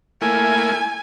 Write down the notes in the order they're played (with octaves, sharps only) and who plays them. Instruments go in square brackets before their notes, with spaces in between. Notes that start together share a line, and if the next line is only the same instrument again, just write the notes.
[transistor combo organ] A3 A#3 E4 [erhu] G#5